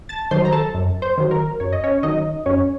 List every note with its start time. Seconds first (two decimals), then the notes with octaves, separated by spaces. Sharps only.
0.09 A5 A6
0.31 D#3 F#3 C5 C6
0.45 A#5
0.52 A4 A5
0.74 F#2
1.02 C5
1.18 D#3 F#3
1.31 A#4
1.60 F#2 C#5
1.72 D#5
1.84 C#4 C#5
2.03 D#3 F#3 D#4 D#5
2.46 F#2 C#4 C#5